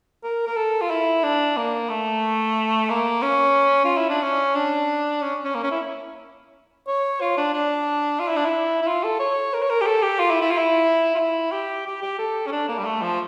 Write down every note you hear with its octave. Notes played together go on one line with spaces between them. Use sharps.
A#4
A#4
A4
F4
E4
D4
A#3
A3
A#3
C#4
F4
E4
D4
C#4
D4
C#4
C#4
A#3
C#4
E4
C#5
F4
D4
D4
F4
E4
D4
E4
E4
F4
A4
C#5
A#4
C#5
A#4
G4
A4
G4
F4
E4
E4
F4
E4
F4
E4
G4
G4
G4
A4
C#4
D4
A#3
G3
A3
F3